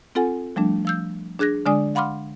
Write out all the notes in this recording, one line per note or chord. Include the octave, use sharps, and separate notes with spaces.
C4 F4 A4 F#5 G#5
F3 G3 A3 D4
F3 E6 G6
D4 G#4 F#6 G#6 A#6
D3 G#3 D4 D5 G#5 D#6
F5 F#5 B5 C6 D6 F6